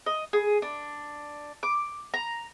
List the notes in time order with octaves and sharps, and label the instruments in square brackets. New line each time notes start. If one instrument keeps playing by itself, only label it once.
[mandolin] D#5
G#4
D4
D6
A#5